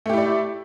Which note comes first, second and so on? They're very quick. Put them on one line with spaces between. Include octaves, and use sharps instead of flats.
A3 G4 E4 D5